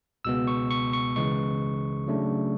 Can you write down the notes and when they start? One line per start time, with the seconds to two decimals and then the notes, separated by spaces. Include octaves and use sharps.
0.25 C#2 B2 G#3 B3 E6
0.47 C#6
0.71 C#6
0.93 C#6
1.16 C#2 C#3 E3 G#3 C#6
2.07 C#3 F#3 A3 D4